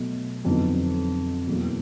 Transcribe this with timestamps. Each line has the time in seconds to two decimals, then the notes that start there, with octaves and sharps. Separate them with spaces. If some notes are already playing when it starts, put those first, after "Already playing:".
Already playing: B2 F#3 A3
0.45 F2 D3 F#3 B3 D#4
1.47 E2 B2 F#3 A#3